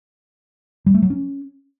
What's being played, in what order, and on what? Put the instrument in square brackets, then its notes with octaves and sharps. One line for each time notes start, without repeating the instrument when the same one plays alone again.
[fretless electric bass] G3
A3
F#3
C#4